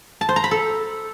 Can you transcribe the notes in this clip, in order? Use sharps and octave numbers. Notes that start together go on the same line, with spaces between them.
A5
C5
A#5
B5
A4